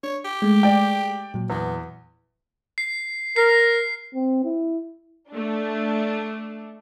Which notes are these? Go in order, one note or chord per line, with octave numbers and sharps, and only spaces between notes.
D4 C#5
G4
G#3 A3
D5 G5
A#2 F#3
E2 B3
C7
A#4 C7
C4
E4
A3 D4